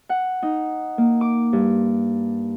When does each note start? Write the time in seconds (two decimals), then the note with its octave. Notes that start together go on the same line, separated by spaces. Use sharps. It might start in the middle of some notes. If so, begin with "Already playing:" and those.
0.09 F#5
0.43 D#4
0.98 A#3
1.21 D6
1.53 G2